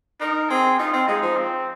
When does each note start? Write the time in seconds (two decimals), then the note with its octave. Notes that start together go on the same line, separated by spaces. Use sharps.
0.20 D#4 A#4
0.50 C4 G#4
0.79 D#4 F4
0.93 C4
1.08 G#3 D#4
1.22 F3
1.37 C4